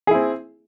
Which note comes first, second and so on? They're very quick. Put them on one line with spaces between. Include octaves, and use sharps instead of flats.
G#4 E4 C4